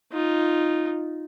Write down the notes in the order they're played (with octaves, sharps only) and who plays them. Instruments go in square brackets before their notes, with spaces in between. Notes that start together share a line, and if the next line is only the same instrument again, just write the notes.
[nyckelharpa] D#4 F4